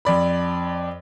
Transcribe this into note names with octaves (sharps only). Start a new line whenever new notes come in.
F2 D5 B5